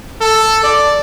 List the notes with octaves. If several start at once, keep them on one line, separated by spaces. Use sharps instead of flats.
A4
D5